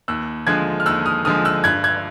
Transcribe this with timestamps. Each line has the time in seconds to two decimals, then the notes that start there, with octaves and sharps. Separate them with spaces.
0.08 D#2 E6 F#6
0.47 D3 F3 G#3 F#6 G#6
0.80 F6
0.86 D#2 E6 F#6
1.06 D#6 F6
1.25 D3 F3 G#3 D#6 F6
1.45 E6 F#6
1.64 G2 F#6 G#6
1.84 F#6 G#6